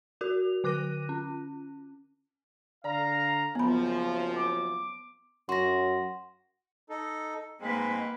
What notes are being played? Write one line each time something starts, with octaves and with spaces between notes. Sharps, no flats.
F#4 A#4 F7
D3 D6 F#6 A#6 D#7
C#4
D3 D5 F5 A#5
F#1 F#2 F3 B3 B5
D6
F#2 F#4 C6 A#6
D#4 A4
G#2 G#3 A#3 C4 B4